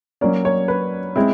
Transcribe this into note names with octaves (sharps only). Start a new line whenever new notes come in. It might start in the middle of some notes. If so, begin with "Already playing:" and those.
F#3 A#3 C#4 D5
C#5
B4
G#3 C4 E4